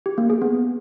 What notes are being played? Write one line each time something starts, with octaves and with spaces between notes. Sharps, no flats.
G4
A#3
G#4
B3